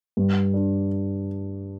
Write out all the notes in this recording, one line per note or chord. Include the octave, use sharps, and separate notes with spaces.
G2
D4